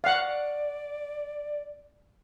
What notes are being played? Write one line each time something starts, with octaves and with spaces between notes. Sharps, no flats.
D5 F5 F#5